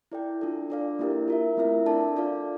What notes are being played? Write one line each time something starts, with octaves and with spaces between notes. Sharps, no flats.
E4 A4 D5 G5
D4 F4 A4
D4 A4 D5 F5
A#3 E4 G4 A#4
F4 A#4 E5
A3 C4 E4 A#4 E5
D4 A4 D5 A5
F4 A4 D5 F5